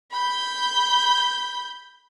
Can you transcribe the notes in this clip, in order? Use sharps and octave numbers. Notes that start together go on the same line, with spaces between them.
B5 G6